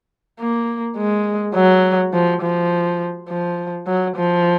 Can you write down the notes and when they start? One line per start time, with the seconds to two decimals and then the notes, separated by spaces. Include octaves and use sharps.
0.40 A#3
0.98 G#3
1.55 F#3
2.13 F3
2.42 F3
3.29 F3
3.87 F#3
4.16 F3